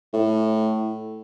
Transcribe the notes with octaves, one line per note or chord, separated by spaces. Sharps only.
A2